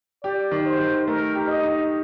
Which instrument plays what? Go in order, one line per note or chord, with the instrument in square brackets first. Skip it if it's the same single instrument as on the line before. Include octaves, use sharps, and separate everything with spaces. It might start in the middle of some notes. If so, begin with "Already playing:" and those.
[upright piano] G4 [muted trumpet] D5
[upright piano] D#3
[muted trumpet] C5
[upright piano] D#3
[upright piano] A3 [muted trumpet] A#4
[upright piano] G4
[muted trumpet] D#5
[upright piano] D#4